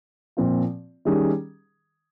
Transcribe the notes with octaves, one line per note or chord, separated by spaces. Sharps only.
A#2 F3 C4 F4
D#3 G3 C#4 G#4